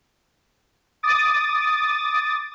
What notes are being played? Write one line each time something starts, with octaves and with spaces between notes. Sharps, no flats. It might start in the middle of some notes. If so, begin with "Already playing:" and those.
D6 D#6 A6